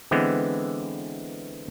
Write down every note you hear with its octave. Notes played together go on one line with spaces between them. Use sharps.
D3 E3 G#3 B3 C4